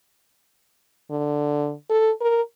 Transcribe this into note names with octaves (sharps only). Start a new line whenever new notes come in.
D3
A4
A#4